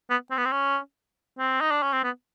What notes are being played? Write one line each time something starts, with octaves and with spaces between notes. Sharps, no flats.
B3
C4
B3
C4
C#4
C4
D#4
D4
C#4
C4
B3